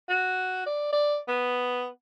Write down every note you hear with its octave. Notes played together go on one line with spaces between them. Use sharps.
F#4
D5
D5
B3